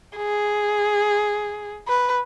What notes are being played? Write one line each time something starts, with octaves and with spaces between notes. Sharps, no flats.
G#4
B4